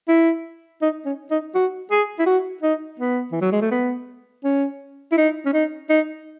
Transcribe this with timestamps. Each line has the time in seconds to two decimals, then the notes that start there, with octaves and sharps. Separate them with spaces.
0.08 E4
0.82 D#4
1.05 C#4
1.31 D#4
1.55 F#4
1.91 G#4
2.19 E4
2.26 F#4
2.62 D#4
2.99 B3
3.32 E3
3.41 F#3
3.52 G#3
3.61 A3
3.71 B3
4.44 C#4
5.12 E4
5.17 D#4
5.45 C#4
5.53 D#4
5.89 D#4